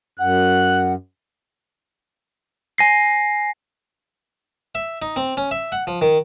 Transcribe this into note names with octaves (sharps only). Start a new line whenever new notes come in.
F#2 F#5 F#6
G#5 A#6 C7
E5
D#4
C4
C#4
E5
F#5
F3
D#3